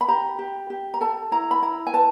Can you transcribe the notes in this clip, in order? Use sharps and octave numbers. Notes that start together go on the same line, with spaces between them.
B5
G4 A#5
G4
G4
A#5
A4 A5
E4 A#5
B5
E4 A#5
G#5
B4 A5